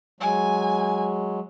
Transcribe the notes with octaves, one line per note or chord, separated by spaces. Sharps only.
F#3 G#3 G#5